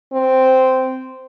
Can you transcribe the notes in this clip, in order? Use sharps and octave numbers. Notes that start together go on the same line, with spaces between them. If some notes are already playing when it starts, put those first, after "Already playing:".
C4